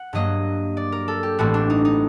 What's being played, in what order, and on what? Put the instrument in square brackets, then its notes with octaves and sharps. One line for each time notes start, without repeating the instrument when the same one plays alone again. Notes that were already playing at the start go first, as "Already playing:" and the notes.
Already playing: [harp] F#5
G2 F#3 A#3 D#5
D5
A#4
A4
G4
A1 A2 A3 C4 F#4
D4
D#4
D#4